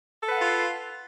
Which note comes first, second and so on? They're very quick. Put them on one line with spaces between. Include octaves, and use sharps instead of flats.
A4 B4 F#5 F5 F4